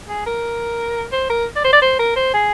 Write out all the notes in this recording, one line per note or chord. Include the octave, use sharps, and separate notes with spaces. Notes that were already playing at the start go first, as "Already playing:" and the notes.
G#4
A#4
C5
A#4
D5
C5
D5
C5
A#4
C5
G#4